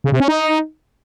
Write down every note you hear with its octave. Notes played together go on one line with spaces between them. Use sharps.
C#3
C3
C#4
D#4